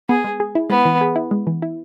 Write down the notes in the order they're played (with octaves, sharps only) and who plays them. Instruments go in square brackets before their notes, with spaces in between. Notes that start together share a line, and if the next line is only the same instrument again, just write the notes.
[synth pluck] B3 [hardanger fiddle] G#4
[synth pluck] G#3
G#4
E4
[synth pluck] G#3 [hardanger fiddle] B3
[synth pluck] E3
G#4
E4
G#3
E3
E4